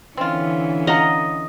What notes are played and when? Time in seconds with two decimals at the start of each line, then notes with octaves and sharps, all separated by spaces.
0.17 D3 E3 C4 C#4 F4
0.87 D#5 F5 F#5 A#5